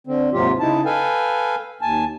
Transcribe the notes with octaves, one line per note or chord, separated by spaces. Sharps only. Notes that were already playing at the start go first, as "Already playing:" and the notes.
D3 C4
D#2 G#2 C3 F#3 F4 G4
C#3 D#4 E4 A5
A4 B4 F5 G5 G#5
D#2 G#5 A5